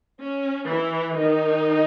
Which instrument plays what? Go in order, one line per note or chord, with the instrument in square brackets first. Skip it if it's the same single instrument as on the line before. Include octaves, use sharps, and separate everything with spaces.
[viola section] C#4
E3 E4
D#3 D#4